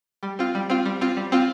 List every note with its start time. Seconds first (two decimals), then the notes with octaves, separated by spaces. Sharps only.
0.23 G3
0.39 C4 F4
0.55 G3
0.70 C4 F4
0.86 G3
1.01 C4 F4
1.17 G3
1.32 C4 F4